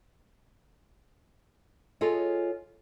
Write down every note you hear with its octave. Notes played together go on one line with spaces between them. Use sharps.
F4 G#4 A4 C#5 D#5